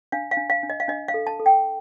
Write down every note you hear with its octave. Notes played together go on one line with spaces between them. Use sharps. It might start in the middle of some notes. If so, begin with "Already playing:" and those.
D4 F5
F5
D4
F5
D4
D#5
F5
D4 D#5
F5
A4
A5
A4
G5